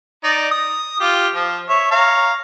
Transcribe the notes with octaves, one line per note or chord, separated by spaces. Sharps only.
D#4 D5
D#6
F4 G4
F3
C#5 E5
C#5 F5 A#5